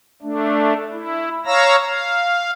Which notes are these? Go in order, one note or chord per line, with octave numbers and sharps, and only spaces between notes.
A3 D4
E4
C#5 F5 A#5 E6 A#6
F5